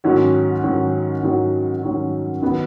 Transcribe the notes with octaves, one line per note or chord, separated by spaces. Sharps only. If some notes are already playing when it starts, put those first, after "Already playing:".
G#2 D#3 F#3 C#4 F#4
G#2 D#3 F#3 C#4 F#4
G#2 D#3 F#3 C#4 F#4
G#2 D#3 F#3 C#4 F#4
D#3 F#3 B3